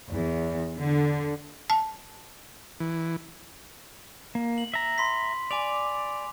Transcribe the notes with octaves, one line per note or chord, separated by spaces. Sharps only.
E2
D3
A5
E3
A#3
F#7
E5 A#5
B5 C6 B6
D5 G#5 D6 F7